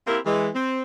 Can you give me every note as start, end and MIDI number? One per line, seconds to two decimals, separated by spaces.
0.07 0.19 58
0.07 0.19 60
0.07 0.19 64
0.07 0.19 67
0.07 0.19 70
0.26 0.48 52
0.26 0.48 56
0.55 0.82 60